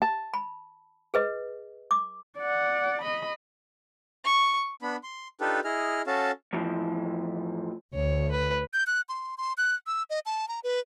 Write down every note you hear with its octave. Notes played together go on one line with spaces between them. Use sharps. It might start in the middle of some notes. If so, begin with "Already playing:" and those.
A5
B5
G#4 B4 D#5
D6
D5 F#5
D#5 B5
C#6
B3 D4 B5
C6
D4 D#4 F4 G4 A4 B4
E4 G#4 D#5 F6
C#4 F#4 A4 F5 A5
F2 A2 E3 F3
D2 C#5
B4
G6
F#6
C6
C6
F#6
E6
D#5
A5
A#5
B4